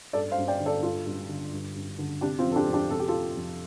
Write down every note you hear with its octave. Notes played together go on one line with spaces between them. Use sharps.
G2 A4 D5
C5 F5
G2
D5 G5
D3
A4 D5
G2 F4 A4
G2
D3
G2
G2
D3
C3 D4 G4
C4 F4
F2
A4
D4 G4
F2
D4 G4
C3 A4
G4
F4 A4
C3
F2